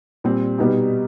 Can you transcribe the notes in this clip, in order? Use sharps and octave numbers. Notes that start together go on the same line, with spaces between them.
A#2 G3 C4
B2 G3 B3 D#4 G4